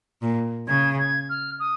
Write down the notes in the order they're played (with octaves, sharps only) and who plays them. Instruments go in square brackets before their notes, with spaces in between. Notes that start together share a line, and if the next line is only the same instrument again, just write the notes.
[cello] A#2
[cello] C#3 [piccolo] G#6
[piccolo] G#6
F6
D#6